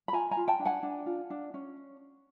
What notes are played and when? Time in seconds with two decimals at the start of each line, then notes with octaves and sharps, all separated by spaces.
0.08 B5
0.13 F4 G#5 A#5
0.31 G#5 A#5
0.37 F4
0.48 G5 A5
0.60 D4
0.65 F#5 G#5
0.83 D4
1.06 F4
1.30 D4
1.54 C#4